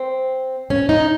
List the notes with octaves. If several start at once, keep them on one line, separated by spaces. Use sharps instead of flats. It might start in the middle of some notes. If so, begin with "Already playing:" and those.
Already playing: C4
C#4
D#4